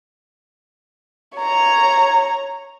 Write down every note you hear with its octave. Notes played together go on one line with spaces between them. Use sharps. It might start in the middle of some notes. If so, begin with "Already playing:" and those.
C#5 A#5